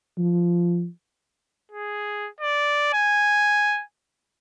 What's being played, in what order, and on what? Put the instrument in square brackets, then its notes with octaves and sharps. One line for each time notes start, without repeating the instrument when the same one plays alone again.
[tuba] F3
[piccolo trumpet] G#4
D5
G#5